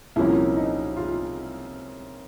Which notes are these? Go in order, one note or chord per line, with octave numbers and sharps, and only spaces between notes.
C2 A#2 F3 A#3 C#4 E4
D#4
F4